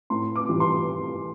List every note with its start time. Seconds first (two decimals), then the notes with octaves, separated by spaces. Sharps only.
0.10 A2 C6
0.36 D6
0.49 E3 G3
0.60 C6